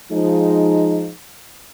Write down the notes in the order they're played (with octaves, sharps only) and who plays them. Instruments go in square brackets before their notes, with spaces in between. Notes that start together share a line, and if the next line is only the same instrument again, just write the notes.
[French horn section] F3 G#3 D#4